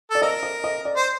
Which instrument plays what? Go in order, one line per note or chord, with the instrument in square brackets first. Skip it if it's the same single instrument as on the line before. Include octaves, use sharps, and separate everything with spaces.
[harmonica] A4 [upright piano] D5
[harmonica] A#4 [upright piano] D#5
[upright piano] D#5
D#5
D5
[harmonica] C5